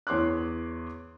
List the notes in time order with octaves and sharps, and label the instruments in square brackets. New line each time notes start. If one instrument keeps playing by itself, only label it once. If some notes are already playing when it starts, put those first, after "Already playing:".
[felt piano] E2 C#5 C6 D6 F#6